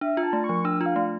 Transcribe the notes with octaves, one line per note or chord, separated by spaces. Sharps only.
D4 E5
F4
A5
A3
C#6
F3
D4 E6
F4
F5
A3